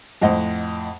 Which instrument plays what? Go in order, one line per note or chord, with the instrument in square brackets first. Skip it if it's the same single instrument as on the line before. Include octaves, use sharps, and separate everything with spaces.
[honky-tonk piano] F2 A2 C5 D#5 F#5